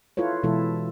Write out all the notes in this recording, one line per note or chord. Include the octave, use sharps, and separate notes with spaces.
E4 F4 A4 B4 C#5
B2 E3 G#3 E4 A4